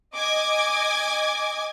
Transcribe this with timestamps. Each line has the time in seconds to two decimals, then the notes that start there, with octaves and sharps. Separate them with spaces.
0.16 D#5 G#5 D6 G#6